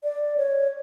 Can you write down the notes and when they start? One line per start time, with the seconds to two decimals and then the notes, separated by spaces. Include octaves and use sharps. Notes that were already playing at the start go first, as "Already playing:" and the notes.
0.03 D5
0.38 C#5